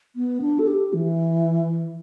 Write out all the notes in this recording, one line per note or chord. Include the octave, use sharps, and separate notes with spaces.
B3
D4
A4
G4
E3